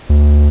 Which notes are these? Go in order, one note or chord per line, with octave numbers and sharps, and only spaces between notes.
D2